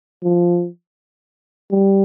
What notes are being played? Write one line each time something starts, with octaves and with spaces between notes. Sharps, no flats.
F3
G3